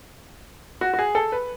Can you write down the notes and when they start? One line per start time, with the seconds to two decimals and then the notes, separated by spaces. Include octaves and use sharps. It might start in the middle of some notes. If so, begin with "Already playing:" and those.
0.81 F#4
0.94 F#4
0.99 G#4
1.15 A4
1.32 B4